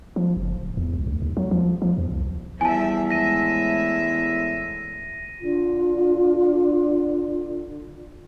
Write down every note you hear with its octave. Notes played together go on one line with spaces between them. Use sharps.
F3
F#1
D1
E2
C#2
D2
D#2
F#3
F3
F3
E2
C2
E2 F3 G3 E5 G#5 A5
A2 G#3 E5 A#6 D#7
D3 F4